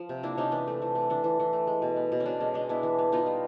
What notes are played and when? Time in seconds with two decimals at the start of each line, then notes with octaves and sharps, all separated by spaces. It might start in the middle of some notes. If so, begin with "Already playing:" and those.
Already playing: F3
0.09 C3
0.23 A#3 D4 E4
0.37 C3 C#4 D#4
0.52 E3 D4
0.67 A3
0.82 E3
0.95 A3
1.10 E3 D4
1.24 E3
1.40 E3
1.53 A3
1.67 G#3
1.82 B2
1.96 B3
2.12 B2
2.20 C#4
2.26 B2 D4
2.40 G#3 C#4
2.54 G#3 D4
2.69 B3 D4 E4
2.83 E3
2.99 B3
3.12 B3 D#4 F4
3.26 G3